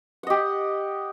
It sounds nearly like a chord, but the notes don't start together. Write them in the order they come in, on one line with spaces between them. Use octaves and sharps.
F#5 D#5 G4